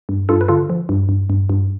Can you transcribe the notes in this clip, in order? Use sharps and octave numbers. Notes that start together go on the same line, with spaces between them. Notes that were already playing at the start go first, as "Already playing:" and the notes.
G2
G2 F4 A4
B4
D3 F4 A4
F3
G2
G2
G2
G2